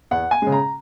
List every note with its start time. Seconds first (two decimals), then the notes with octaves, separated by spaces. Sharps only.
0.11 E2 F#5
0.31 G#5
0.42 C#3 G#3
0.52 A#5